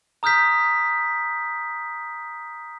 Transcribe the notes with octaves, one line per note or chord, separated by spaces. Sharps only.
A#5 D#6 F6 G6 B6